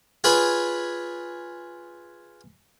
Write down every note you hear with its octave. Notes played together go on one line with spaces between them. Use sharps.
F4 G#4 B4 C#5 B5